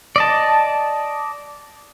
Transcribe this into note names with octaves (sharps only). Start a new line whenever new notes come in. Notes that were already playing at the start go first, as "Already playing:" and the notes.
D5 D#5 A5